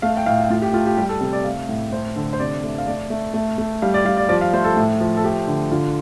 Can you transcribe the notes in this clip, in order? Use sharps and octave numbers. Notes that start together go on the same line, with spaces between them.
A3 F5
G5
A2 F5
A2 F4
G4
A3 F4
G4
G3 G4
A4
C3 A4
D5
A3 F5
A2
A3 C5
D3 A4
C5
C3 D5
A3
F5
A3 D5
A3
A3
A3
G3 F5
D5
G3 F5
D5
F3 D5
F5
A3 C5
A4
A2
F3
A4
A3 G4
D3
D3 F4